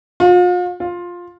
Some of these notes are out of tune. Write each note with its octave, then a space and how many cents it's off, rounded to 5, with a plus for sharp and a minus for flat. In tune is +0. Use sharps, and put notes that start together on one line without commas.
F4 +40
F4 +10